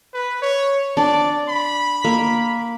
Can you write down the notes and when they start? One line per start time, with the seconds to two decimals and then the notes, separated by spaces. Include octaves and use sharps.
0.13 B4
0.42 C#5
0.97 D4 D5
1.49 B5
2.05 A#3